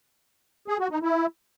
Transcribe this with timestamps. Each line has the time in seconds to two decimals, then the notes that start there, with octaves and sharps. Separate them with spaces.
0.68 G#4
0.79 F#4
0.91 D#4
1.02 E4